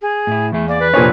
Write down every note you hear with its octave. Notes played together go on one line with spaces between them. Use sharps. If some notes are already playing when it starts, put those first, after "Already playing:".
G#4
A2 E4
E2 A3 G#4
A#3 D5
B4
F1 A#2 D4 C5 C#5 G#5